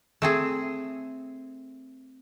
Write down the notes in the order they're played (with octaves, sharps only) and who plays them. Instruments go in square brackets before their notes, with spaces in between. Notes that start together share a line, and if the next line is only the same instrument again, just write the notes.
[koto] A3 C4 G#4